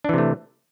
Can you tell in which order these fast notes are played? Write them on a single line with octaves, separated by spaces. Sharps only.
D4 E3 C3 A3